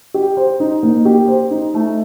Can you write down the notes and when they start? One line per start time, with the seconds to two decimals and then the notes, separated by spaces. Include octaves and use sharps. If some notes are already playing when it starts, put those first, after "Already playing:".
0.14 G4
0.37 C5
0.60 D#4
0.83 A#3
1.05 G4
1.28 C5
1.51 D#4
1.74 A3